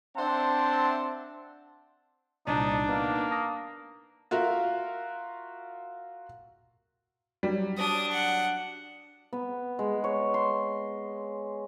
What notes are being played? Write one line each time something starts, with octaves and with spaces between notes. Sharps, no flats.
C4 D4 C5 E5 F#5 A5
C2 A#2 D4 D#4 D5
A#3 B3 D#4 B4
A5 D#6 A#6
F4 F#4 A#4 E5 F5
F#3 G3
D4 D#6
F#5
B3
G#3
C#5
C6